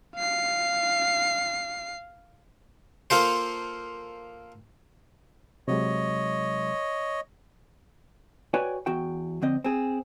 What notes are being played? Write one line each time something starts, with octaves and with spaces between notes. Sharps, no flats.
F5 C7
A#3 F4 A4 C5
C3 F#3 G#3 C#5 D#5
F#4 B4 C#5 D5 G5 G#5
E2 F#4 G5
F2 D3 C4 D#5
C4 G#4